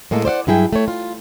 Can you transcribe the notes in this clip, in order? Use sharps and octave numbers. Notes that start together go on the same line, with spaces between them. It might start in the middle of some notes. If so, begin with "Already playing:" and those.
A2 G#3 A#3 A4
C5 D5 F5 F#5
G2 F#3 E4 G#4 G5
A3 C#5
F4